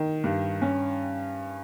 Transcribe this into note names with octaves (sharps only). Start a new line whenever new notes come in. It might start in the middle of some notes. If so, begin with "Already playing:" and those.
Already playing: D#3
G2
C#4